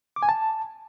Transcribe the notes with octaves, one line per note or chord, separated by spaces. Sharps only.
D6
G#5
A5